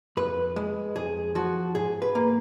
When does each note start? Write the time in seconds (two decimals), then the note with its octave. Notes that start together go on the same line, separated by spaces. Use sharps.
0.17 F2 B4
0.56 G#3
0.96 F2 G#4
1.35 F3 F#4
1.75 G#2 G#4
2.02 B4
2.15 A#3